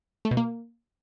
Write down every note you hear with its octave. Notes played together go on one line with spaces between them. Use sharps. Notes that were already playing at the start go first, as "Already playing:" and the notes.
A3
B2
A#3